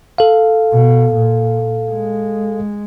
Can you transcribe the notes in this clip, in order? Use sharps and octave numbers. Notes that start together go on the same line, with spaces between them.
A4 F5
B2
A#2
G#3